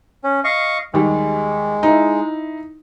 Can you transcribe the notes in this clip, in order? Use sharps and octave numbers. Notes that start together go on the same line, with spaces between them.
C#4
D#5 F5 C#6
D#2 G3 G#3
D#4 E4